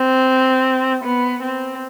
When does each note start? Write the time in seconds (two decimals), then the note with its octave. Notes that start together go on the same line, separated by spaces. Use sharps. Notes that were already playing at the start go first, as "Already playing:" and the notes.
Already playing: C4
1.04 B3
1.43 C4